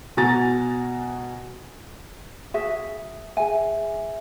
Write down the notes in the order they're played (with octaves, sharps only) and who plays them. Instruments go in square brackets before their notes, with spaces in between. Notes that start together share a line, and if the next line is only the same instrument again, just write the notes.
[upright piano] B2 F#4 G#5 A#5 A6
[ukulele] F#4 G#4 E5
[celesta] G#4 E5 [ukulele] G#5